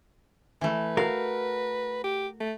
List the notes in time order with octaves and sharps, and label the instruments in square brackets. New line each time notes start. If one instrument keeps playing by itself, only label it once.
[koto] E3 A3 [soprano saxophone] B4
[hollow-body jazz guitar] F#4 A#4 [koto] F5
[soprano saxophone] G4
A3